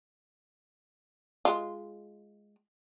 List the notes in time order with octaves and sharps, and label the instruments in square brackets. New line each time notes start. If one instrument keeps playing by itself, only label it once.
[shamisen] G#3 F4